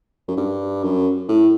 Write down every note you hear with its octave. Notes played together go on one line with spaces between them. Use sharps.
F#2
G2
F#2
A2